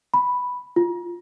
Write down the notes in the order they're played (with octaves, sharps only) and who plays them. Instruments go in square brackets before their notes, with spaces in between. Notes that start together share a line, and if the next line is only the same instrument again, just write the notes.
[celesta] B5
F4